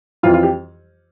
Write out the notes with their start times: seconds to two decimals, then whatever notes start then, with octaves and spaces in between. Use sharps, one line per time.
0.23 F2 E3 F4
0.34 F4
0.43 G4